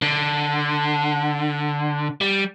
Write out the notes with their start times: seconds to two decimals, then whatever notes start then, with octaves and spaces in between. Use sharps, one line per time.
0.02 D3
2.21 G3